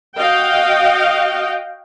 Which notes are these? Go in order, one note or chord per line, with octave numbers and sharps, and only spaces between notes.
F#4 D#5 F5 G5